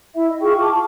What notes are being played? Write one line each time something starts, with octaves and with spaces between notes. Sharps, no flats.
E4 E5
D#5
F4 G#4 G5 C#6
A5 D6
A5